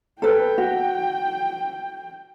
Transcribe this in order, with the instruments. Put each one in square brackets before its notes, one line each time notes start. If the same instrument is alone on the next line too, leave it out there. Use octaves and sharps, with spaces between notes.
[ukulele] A4 B4 [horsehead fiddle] G5
[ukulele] F#4